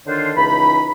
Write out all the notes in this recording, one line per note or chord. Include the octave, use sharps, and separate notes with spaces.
D3 D#3 D4 F4 C5 C#5
C#2 E3 D#4 B5